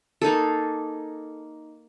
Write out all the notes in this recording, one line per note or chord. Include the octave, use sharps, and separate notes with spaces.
A#3 D#4 G#4 A4